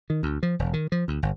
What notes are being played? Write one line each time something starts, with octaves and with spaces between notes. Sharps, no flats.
D#3
D2
F3
E1
D#3
F3
D2
G1